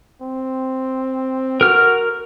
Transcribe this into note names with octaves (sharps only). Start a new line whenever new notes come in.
C4
F#4 A#4 F6